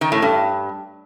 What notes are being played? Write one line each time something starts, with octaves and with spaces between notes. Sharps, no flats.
D#3
A2
G2